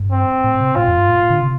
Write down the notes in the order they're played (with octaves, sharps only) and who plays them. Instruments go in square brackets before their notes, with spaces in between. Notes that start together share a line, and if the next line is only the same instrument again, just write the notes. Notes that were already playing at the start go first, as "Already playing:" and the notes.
Already playing: [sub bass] G2
[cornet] C4
[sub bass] A2
C3
[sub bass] A2 [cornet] F4
[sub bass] F2
G2
A2
A2
D3
C3